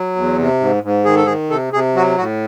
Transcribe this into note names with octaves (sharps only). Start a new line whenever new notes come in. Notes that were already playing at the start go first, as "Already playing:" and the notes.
Already playing: F#3
E2
C3
G#2
G#2
D#3 G#4
A4
D#3 G#4
C3 A4
C3 G#4
F#3 F#4
A2 F#4